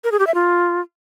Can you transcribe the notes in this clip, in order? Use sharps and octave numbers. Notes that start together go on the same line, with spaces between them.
A#4
G#4
G4
E5
F4